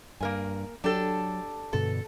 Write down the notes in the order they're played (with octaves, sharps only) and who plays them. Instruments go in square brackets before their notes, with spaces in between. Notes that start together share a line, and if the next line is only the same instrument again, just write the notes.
[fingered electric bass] G2 [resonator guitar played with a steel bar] A#3 A#4 G#5
[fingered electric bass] F#3 [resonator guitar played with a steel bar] D4 G4 A4
[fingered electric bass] G2 B2 D3 [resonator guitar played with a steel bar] A4